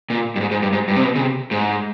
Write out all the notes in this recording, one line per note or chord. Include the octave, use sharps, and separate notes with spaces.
A#2
G2
G#2
G#2
G2
G#2
G2
C3
B2
C#3
C3
G#2